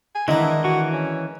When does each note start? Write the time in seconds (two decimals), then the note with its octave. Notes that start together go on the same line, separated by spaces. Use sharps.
0.15 G#5
0.28 D#3 E3 G#3 A#3 D4 E4 D#5 F#5
0.64 E3 F#4
0.92 C#4